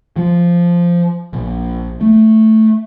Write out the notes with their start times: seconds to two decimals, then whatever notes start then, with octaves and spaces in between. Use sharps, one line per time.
0.16 F3
1.33 A#1
2.01 A3